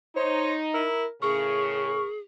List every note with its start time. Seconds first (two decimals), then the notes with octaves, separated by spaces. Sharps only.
0.16 D#4 C5 C#5
0.74 E4 A#4
1.22 A2 C#3 G#4 A#4 C#6